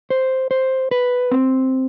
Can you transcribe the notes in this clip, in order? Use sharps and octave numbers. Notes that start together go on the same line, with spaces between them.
C5
C5
B4
C4